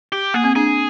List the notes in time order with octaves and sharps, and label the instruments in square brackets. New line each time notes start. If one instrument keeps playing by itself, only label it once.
[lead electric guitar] G4
[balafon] A#3 [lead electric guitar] G#4
[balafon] C4
[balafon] D4 [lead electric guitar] G#4